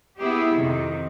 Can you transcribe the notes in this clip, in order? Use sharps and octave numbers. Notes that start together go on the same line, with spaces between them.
B3 E4 G4 G#4
F2 C3 D#3